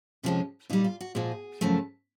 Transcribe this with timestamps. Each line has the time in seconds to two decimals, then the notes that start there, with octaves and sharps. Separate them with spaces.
0.23 F2 C3 F3 G#3 C#4
0.70 A#2 G3 D#4
0.84 F4
1.01 F#4
1.15 A#2 F3 G#3 G#4
1.61 F#2 C#3 F3 A3